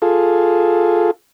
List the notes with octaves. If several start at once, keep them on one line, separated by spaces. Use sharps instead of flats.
F4 G#4 A4